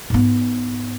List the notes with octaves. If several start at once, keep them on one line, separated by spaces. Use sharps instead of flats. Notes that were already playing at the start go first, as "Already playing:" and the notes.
G#2 B3